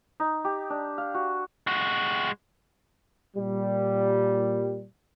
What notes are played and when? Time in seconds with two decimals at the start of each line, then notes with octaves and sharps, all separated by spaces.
0.20 D#4
0.45 G4
0.70 D4
0.98 F5
1.14 F#4
1.67 G#3 F#4
3.36 A#2 G3